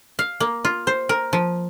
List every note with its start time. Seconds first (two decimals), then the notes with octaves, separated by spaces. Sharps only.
0.19 F5
0.40 A#3
0.65 F4
0.87 C5
1.09 A#4
1.33 F3